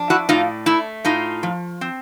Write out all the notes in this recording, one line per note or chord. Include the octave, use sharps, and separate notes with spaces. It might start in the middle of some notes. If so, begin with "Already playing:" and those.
Already playing: F3 D4
E4 F#4
A2 D#4 F4
A3 E4
A2 D#4 F4
F3
C4